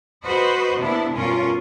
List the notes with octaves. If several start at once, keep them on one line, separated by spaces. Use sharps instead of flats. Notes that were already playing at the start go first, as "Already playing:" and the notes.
F#4 B4 C5 D#5
C3 A#3 B3 D4 E4
G2 B2 C#4 F4 A#4